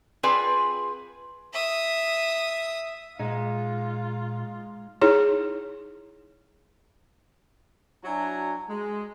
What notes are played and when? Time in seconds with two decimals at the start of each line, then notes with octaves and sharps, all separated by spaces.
0.23 C4 F4 G#4 B4 D5 G#5
1.53 E5 D#6
3.19 A#2 G#3 D#4 F4
5.01 D#4 E4 G#4 C#5
8.04 F#3 D4 E4 F#4 G#5 A#5
8.69 G#3